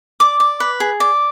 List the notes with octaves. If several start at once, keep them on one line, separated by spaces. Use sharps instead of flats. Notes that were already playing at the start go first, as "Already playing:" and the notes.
D5 D6
D5
B4
G#4
D5